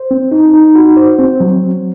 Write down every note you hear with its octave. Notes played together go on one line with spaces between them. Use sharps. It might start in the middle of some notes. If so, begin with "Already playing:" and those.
Already playing: C5
C4
D#4
D#4
F#4
C5
C4
F#3